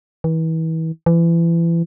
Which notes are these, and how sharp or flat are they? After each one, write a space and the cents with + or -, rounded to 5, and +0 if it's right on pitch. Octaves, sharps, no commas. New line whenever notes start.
E3 -35
E3 +30